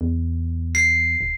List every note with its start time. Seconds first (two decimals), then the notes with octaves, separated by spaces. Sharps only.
0.01 E2
0.75 C7
1.21 D1